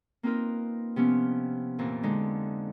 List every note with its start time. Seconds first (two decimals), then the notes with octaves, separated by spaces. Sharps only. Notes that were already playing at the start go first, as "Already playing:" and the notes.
0.23 A#3 C4 D#4 F4 A#4 B4
0.96 C3 F3 B3 C#4
1.79 F2 A#2 E3
2.03 D3 G#3 D#4